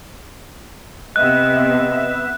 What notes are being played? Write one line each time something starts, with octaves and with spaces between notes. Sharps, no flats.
C3 B3 D#5 E5 F#6 E7